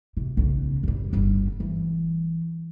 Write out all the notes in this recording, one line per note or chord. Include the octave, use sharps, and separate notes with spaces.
C3
B1 C#3
F#2 G3
G1 G3
E3